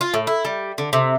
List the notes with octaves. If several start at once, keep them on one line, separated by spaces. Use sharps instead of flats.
F4
A2
E4
G3
D3
C3